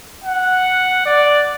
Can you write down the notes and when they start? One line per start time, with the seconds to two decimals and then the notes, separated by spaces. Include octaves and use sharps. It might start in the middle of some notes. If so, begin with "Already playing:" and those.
0.24 F#5
1.06 D5